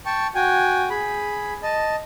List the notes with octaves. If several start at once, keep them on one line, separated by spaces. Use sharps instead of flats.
G5 A5 C#6
F#4 G5 G#5
G#4 B5
D#5 A5